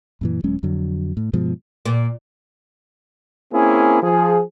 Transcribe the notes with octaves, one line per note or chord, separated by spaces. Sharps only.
F#2 A#2 E3
D#1 F#3 G#3 C#4
F2 D3 F#3
A2
G2 B2 F3 G#3
A#2
A#3 C4 C#4 E4 G#4
F3 G#4